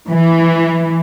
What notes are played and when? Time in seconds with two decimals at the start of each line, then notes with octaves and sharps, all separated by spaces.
0.10 E3